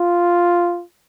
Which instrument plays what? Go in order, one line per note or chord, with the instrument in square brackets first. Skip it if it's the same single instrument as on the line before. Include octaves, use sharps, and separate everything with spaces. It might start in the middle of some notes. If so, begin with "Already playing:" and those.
Already playing: [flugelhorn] F4